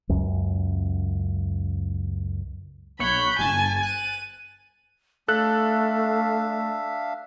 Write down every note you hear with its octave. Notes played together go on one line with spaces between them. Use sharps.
C#2 F#2
B1 C#5 F#5 B5 G6
G1 G#5 A5
F#6 A6 D#7
A3 D4 A4 E5 F5 F#6